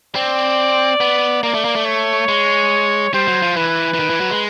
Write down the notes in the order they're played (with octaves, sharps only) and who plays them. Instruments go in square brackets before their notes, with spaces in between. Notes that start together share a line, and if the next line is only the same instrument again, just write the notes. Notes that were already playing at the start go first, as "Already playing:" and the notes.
[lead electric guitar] C4 [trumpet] D5
[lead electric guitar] B3
[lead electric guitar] A#3 [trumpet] D5
[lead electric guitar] A3
A#3
A3
[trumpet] C#5
[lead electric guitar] G#3
[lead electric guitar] G3 [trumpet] C5
[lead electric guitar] F#3
F3
[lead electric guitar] E3 [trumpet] B4
[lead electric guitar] E3
D#3
E3
F#3
G#3